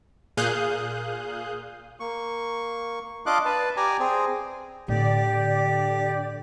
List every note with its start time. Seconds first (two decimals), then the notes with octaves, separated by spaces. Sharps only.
0.37 A#2 G#4 F5 D#6 F#6 G6
2.00 A#3 C#6
3.26 D4 F4 D#5 F5 D6 F#6
3.45 B4 A5
3.77 G4 D5 G#5 A#5
4.00 C4 G#4
4.88 A2 D3 A#3 G4 D5